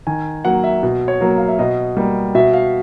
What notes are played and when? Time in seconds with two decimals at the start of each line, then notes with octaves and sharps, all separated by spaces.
0.07 D#3 G#5
0.45 F#3 A#3 F#5
0.64 E5
0.83 B2
1.08 C#5
1.21 F#3 A#3
1.38 F5
1.48 E5
1.59 B2 D#5
1.97 G3 A#3
2.35 B2 E5
2.53 F5